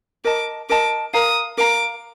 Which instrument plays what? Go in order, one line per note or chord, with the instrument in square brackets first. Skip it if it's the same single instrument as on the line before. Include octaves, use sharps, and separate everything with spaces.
[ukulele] A#4 D#5 A5 [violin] D6
[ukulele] A#4 D#5 A5 [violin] D6
[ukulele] A#4 F5 A#5 [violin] D#6
[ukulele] A#4 F5 A#5 [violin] D6